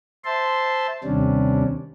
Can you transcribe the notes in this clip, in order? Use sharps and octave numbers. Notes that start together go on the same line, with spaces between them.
C5 E5 A5 C6
D#2 C3 G3 C#4 D4